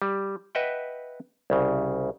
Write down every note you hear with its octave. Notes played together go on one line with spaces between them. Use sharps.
G3
B4 D#5 E5 F#5 G5
C2 C#3